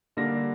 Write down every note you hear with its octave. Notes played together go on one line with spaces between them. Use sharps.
D3 G3 A#3 D4 A#6